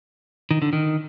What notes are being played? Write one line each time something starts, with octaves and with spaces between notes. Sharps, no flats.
D#3
D3
D#3